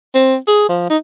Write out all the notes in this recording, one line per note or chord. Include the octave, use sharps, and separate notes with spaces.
C4
G#4
F3
D#4